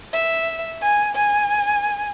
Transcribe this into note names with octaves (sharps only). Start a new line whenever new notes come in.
E5
G#5
G#5